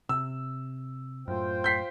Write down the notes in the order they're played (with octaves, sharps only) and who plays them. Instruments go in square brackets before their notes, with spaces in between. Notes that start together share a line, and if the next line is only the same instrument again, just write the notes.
[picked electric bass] C3 [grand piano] E6
[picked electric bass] F#2 A2 [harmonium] F4 C5 G5
[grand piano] G6 B6 C7